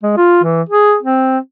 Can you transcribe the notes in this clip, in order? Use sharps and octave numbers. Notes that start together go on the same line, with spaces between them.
G#3
F4
E3
G#4
C4